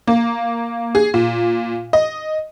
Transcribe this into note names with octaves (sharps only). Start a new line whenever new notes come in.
A#3
G#4
A#2
D#5